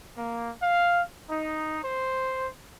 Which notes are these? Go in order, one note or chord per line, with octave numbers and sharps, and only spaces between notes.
A#3
F5
D#4
C5